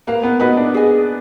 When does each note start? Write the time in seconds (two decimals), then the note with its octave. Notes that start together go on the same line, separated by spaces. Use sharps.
0.07 A#3 B4 F5 A#5
0.23 B3
0.40 B3 D#4 F#4 B4 D#5
0.57 D4
0.74 G#4 D#5 G#5